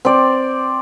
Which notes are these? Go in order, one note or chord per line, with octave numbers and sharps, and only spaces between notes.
C4 D5